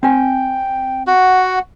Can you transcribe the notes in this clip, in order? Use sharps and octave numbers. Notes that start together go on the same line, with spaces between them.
C4 G5 G#5
F#4 F#5